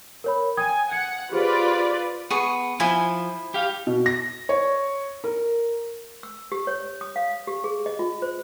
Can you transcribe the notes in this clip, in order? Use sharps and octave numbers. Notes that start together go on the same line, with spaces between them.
A#4 C#5 B5
G5 G#5 D#6 G#6
F#5 G#6 C#7
F4 G4 G#4 B4 C5 D5
B3 G#4 C#6
F3 E4 G#5
G4 F5
B2
A#6
C#5
A#4
E6
G4
C#5
D#6
F5
G4
G#4
D#5
F4
C5